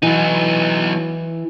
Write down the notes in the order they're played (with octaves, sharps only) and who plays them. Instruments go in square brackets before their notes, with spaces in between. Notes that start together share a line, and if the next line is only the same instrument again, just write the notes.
[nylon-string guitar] E3 [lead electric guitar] F#3 D#4